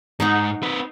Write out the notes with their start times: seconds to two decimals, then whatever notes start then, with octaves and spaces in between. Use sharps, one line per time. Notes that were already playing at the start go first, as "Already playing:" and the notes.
0.20 G#2 D#4 F#5 A#5
0.63 C4 B4